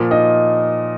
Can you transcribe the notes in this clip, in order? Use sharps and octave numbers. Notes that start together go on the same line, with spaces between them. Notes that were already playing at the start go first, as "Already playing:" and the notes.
Already playing: A#2 F3
D#4 D#5